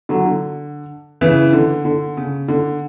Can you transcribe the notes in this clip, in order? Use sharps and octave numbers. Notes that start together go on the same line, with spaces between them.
D3 F#3
D3
C#3 E3
D3
D3
C#3
D3